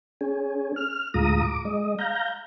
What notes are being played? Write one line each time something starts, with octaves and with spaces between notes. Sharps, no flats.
C#4 G#4
F6
D2 A2 G#3 F4 A#5 D#6
D6
G#3 D#5
F5 A#5 G6